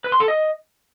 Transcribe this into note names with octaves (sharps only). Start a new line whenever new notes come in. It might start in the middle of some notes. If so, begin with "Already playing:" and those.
B4
C6
A4
D#5